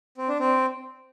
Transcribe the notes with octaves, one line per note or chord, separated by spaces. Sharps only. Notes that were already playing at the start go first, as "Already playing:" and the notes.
C4
D4
C4